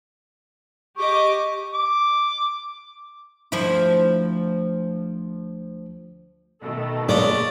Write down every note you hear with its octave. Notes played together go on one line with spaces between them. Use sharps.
G4 D#5 C#6 D6
D6
D2 F3 E4
B2 D#3 A3
A#2 G#3 C#4 D5